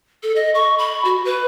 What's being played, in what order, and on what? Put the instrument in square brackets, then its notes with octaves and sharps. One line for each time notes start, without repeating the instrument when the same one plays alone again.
[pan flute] A4
D#5
C#6
B5
F#4
B4